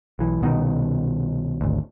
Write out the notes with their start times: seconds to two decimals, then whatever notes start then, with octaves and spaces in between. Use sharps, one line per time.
0.19 B1 E3
0.41 C2 B2 D#3
1.61 G#1 D2